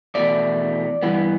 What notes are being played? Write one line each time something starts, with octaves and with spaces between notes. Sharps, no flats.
E2 B2 A3 D5
G2 E3 B3